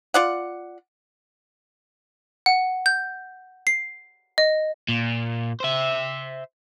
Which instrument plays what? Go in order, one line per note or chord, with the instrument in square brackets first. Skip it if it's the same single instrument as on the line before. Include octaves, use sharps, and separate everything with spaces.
[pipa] F4 D5 F#5
[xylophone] F#5
G6
C7
D#5
[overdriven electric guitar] A#2
C5 E5